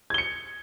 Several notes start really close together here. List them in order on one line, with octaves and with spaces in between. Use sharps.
G#6 G7 C#7